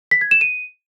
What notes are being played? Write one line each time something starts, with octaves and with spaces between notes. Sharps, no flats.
B6
G#6
E7
D#7